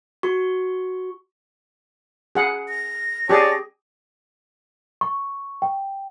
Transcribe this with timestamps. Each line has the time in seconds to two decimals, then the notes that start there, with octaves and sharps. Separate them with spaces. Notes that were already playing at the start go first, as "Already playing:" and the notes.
0.23 F#4 C#6
2.35 G#4 F#5
2.69 A#6
3.29 G4 G#4 C#5 D5 A5
5.01 C#6
5.62 G5